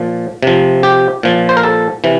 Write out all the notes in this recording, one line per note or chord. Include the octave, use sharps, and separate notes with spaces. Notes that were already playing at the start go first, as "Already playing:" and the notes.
Already playing: A#2 F3
C3 F3
G4
A#2 F3
C5
A#4
A4
C3 E3